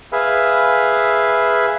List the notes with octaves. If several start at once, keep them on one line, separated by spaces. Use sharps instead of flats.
G#4 B4 E5 F5